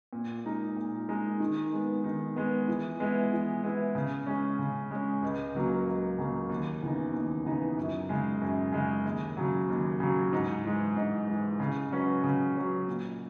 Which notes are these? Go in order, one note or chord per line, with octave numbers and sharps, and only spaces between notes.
A#2
G#3 D#4 A#4
A#2
G#3 D#4 A#4
D#3
G#3 B3
D#3
G#3 B3
E3
G#3 B3 E4
E3
G#3 B3 E4
C#3
G#3 C#4
C#3
G#3 C#4
C#2
C#3 F#3 A#3
C#2
C#3 F#3 A#3
D#2
C#3 E3 B3 D#4
D#2
C#3 E3 B3 D#4
F#2
C#3 G#3
F#2
C#3 G#3
D#2
C#3 F#3
D#2
C#3 F#3
G#2
E3 G#3
G#2
E3 G#3
C#3
F#3 C#4 F#4 B4
C#3
F#3 C#4 F#4 B4
A#2